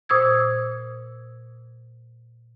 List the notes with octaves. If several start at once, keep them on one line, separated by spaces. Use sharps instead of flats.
A#2 C5 D#6 E6 G#6